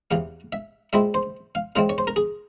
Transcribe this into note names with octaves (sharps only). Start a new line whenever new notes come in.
E2 C3 E3 F5
E5
A#2 G#3 C4 E4 E5
C5
F5
C#3 E3 G#3 C4 F5
C#5
C5
A#4
G#4